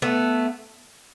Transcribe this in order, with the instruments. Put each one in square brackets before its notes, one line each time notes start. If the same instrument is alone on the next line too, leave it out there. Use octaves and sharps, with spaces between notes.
[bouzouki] A3 B3